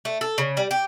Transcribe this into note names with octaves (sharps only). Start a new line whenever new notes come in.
A3
A4
C#3
G3
G4